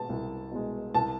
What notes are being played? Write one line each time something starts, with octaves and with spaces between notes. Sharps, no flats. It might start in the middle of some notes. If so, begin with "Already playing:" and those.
Already playing: B2 G#3 A5
C2
B2 G#3
C2 A5